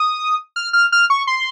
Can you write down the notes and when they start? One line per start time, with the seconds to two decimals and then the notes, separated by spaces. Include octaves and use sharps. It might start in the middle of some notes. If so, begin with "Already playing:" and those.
Already playing: D#6
0.56 F6
0.73 F6
0.92 F6
1.10 C#6
1.27 C6